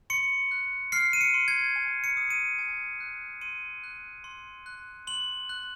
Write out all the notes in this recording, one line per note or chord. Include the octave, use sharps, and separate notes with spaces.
C6 C#7
F#6
F6 C7
D#7
C#7
C6
G#6
G#5
C#7
D#6
D#7
G#5
F#6
C6 D#7
F#6
C6
F#6
C6 F#7
F#6